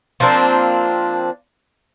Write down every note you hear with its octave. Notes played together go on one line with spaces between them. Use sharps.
F3 A#3 C4 D4